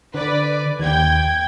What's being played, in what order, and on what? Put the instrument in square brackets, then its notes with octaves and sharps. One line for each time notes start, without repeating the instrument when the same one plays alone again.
[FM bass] D3 [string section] B4 D5
[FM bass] D#2 [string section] G5 G#6